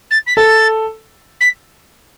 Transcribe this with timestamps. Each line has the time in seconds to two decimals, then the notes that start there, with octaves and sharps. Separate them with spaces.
0.10 A6
0.27 B6
0.36 A4 A6
1.41 B6